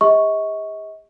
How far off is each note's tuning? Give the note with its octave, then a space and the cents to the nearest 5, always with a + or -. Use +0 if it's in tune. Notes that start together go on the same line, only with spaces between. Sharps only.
G#4 -45 D#5 +40 C#6 +0